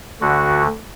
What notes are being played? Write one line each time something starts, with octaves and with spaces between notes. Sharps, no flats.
D2 D3 F#4